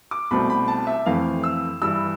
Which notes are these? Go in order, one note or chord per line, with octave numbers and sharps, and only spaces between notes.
D6
C2 B2 A3 C4 B5
B5
A5
E5
F2 E3 A3 C4 F5
E6
G2 E3 G3 E6